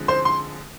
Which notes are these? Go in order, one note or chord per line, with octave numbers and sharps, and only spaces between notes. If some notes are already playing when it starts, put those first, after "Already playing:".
Already playing: D3 F3 G#3 C4
C5 C6
C6